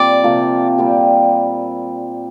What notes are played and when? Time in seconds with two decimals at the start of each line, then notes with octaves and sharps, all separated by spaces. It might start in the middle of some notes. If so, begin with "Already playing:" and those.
Already playing: A#2 G3 C4 D5
0.24 C3 F3 A#3 G4
0.78 A#2 G3 C4 G4